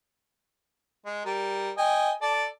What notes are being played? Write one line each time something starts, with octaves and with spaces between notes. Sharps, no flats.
G#3
G3 A#4
D#5 G5 G#5
A4 D5